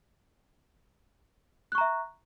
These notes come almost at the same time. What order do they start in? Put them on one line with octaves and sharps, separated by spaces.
F#6 C#6 A#5 E5